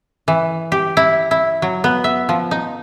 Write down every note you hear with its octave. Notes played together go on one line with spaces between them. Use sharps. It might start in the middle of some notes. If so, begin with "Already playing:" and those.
E3
G4
E4
E4
F#3
B3
E5
F3
D#4